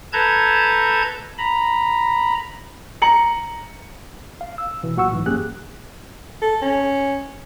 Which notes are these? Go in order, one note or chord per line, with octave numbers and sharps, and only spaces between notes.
A4 B4 A5 A#5 G6 G#6
A#5 B5
A#5 C#7 F#7
F5
E6
B2 E3
B1 A#2 F#4 F#5 C#6 E6
B1 G#2 E3
F#2 A#3 G4 G#4 F#6
A4
C#4